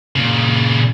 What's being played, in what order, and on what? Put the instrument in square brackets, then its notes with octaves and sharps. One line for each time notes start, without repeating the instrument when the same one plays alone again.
[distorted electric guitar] A#2 C#3